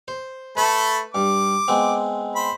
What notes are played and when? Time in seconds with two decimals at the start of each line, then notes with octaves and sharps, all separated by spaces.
0.08 C5
0.57 A3 A4 B4 B5
1.15 G2 D6
1.68 G#3 B3 C4
2.35 C5 B5